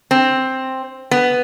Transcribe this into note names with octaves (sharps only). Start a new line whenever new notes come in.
C4
B3